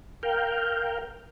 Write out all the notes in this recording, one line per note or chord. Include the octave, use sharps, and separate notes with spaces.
A#4 F5 G5